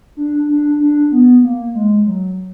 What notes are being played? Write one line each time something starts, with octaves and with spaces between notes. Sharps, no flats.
D4
D4
D4
B3
A#3
G#3
F#3